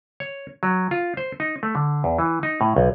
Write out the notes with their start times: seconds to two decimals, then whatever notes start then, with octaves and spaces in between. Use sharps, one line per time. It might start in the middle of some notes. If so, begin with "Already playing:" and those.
0.20 C#5
0.63 F#3
0.91 F4
1.17 C5
1.40 D#4
1.63 A3
1.75 D3
2.04 E2
2.19 E3
2.43 D#4
2.61 A2
2.76 B1